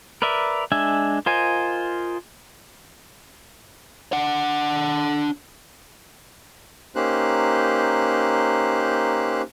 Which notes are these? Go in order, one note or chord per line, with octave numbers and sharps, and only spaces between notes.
A#4 B4 D5 E5
G#3 D4 E5 G#5
F4 A#4 C5 D#5 G#5
D4 F#5
A#3 C#4 D#4 G4 C5 F#6